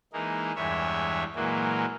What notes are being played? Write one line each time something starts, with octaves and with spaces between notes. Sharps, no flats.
E3 G#3 A#3 D#4
E2 G2 E3 G#3 C#5 E5
A#2 E3 F#3 G#3 A#3